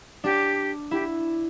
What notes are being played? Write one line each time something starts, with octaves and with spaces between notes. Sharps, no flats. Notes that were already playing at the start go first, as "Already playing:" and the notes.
D4 G4
E4 G4